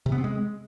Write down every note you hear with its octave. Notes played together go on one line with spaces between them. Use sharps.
C3
B3
C4
G#3